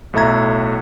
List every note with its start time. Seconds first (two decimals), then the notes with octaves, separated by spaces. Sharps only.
0.13 B1 A2 A4 E5 A#5 G#6